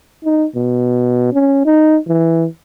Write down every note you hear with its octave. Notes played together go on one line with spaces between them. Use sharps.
D#4
B2
C#4
D#4
E3